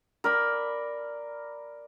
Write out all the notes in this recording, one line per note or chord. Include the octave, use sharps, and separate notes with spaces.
A#4 D5 B5